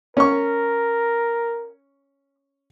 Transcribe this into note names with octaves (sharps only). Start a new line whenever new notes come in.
C#4 A#4 C#6